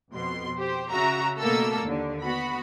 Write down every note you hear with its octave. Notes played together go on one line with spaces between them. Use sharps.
F2 B2 C6
G4 C5
C#3 F#4 E5 A#5
B2 A3 A#3 A4 A#4 E6
D#2 D3
B3 F#4 B5